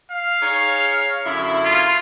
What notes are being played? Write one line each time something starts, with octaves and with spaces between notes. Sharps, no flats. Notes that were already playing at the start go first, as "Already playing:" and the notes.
F5
D#4 G#4 C#5
F#2 D3 E4
F4